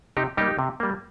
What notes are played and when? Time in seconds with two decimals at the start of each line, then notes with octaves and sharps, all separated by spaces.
0.17 C3 D#4 G4
0.37 G3 A#3 D#4 G4
0.59 C3
0.80 G3 A#3